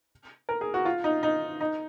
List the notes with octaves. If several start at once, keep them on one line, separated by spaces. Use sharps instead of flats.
A#4
G#4
F#4
F4
D#4
D#4
D#4